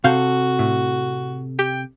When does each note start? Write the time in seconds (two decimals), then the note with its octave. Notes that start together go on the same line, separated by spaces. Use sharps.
0.04 C3 F#4 A4 F5 G6
0.59 A2
1.59 G4 G5